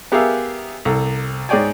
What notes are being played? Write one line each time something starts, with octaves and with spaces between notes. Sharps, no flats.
B3 G4 G#4 A#4 E5 F5
C2 A4
G#2 G#4 C#5 D5 G5 G#5